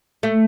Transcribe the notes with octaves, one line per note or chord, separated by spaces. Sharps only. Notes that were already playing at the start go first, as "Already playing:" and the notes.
A3